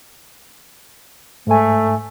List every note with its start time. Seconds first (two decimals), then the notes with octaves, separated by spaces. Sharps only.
1.47 G#2 A3 G#5